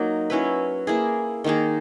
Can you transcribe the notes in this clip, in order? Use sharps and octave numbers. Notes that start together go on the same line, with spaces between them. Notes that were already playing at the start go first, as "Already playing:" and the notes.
Already playing: F#3 A#3 D#4
F#3 C#4 E4 B4
A#3 E4 G#4
D#3 A#3 D#4 G#4